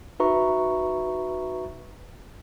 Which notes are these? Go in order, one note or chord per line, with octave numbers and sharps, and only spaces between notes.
D#4 F#4 B4 E5 A#5 C#6